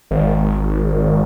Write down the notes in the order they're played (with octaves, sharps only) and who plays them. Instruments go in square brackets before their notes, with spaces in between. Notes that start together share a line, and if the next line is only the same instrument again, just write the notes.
[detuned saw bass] G#1